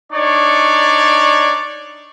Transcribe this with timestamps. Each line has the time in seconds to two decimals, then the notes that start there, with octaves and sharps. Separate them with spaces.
0.12 D4 D#4 C#5 D5 C#6